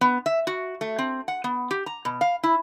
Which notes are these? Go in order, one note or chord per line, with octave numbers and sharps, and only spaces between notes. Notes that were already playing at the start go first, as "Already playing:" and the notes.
B3
E5
F#4
A3
C4
F#5
B3
G4
A#5
B2
F5
E4